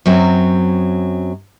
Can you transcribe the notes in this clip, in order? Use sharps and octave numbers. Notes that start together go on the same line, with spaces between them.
F#2 F#3 C4